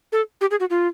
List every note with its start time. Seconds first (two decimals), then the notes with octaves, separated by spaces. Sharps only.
0.12 A4
0.41 G4
0.51 G#4
0.60 F#4
0.70 F4